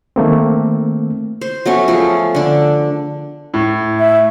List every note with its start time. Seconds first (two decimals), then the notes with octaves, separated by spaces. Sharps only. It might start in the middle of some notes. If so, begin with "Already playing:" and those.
0.16 D#3 A3 A#3 C4
1.41 C5
1.66 F#3 A3 B3 C#4
1.88 F3 A3 G#4 A4
2.35 D3 D4
3.54 A2
4.00 E5